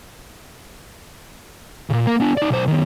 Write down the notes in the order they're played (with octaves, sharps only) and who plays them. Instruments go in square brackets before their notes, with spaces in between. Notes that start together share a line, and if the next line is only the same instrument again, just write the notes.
[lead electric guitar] A#2 C#3
A#3 A#4
B3 D4
D#4 D5
B1 C5
D#3 B3